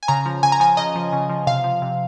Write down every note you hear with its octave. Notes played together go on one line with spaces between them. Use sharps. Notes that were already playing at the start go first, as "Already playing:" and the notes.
G#5
C#3 A#5
F3
C#3 G#5
A#5
F3 G#5
C#3 D#5
F3
C#3
F3
C3 F5
F3
C3